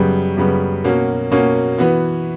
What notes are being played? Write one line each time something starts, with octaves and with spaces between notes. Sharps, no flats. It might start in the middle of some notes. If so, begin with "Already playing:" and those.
Already playing: F#2 C#3 G3 B3
F#2 C#3 G3 B3
B2 A#3 C#4 F#4
B2 A#3 C#4 F#4
E3 B3 F#4